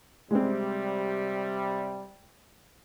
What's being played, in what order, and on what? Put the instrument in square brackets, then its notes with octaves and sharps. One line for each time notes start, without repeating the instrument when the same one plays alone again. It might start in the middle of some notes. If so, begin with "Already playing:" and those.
[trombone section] C3 G3 [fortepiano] G#3 C4